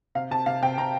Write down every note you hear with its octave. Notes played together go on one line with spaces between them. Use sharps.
C3 F5
C3 A5
C3 F5
C3 G5
C3 A#5